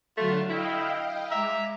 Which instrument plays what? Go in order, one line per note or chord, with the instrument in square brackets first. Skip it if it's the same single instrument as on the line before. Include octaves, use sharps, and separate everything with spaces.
[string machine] D3 F#3 F#4 [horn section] A3 F4
[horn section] E4 [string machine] D#5 F5 G5
[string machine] G#3 D6 [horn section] E5 A#5